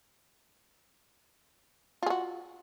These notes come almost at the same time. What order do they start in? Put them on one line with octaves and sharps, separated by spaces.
F4 G#4 F#4